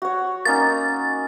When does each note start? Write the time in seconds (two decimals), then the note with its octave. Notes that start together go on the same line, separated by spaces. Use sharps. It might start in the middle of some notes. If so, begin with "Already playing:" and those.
0.02 F#4 C#5
0.45 A#3 C#4 D#4 A6